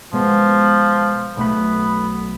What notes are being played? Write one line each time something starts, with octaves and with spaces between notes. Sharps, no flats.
B2 F3 G#3 B3
B1 A3 B3 B5